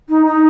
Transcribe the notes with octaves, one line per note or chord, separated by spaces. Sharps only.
D#4
D#4